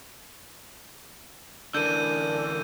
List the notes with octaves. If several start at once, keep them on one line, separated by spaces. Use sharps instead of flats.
D3 E3 D4 A#4 G6 D#7